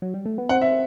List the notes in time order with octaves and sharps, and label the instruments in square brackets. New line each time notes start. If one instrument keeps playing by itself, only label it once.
[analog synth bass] F#3
G3
A3
B3
[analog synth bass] C4 [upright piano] F#5
[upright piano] E5